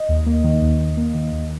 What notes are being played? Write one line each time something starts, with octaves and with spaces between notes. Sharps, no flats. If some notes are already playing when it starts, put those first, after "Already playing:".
Already playing: D#5
D#2
A#3
D#3
D#2
D#2
A#3
D#3
D#2